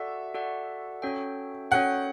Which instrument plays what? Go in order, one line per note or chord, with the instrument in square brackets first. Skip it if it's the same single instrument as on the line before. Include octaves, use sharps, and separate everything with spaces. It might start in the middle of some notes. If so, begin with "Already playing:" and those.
Already playing: [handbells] F#4 A4 D5 F#5 [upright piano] E5
[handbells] F#4 A4 D5 F#5
C#4 F#4 A4 C#5 G5
[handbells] C#4 F#4 A4 C#5 G5 [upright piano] F#5